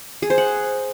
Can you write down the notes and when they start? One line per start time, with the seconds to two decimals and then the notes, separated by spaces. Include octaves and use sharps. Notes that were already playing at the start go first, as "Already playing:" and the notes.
0.22 G#4
0.30 C5
0.38 F#5